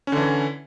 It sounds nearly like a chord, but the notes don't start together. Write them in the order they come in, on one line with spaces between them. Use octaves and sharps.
C#4 D3 E3